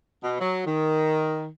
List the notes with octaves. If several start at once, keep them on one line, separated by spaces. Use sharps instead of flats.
B2
F#3
D#3